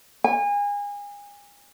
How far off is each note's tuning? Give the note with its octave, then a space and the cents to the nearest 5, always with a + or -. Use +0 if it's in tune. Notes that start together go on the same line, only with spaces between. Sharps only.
G#5 -30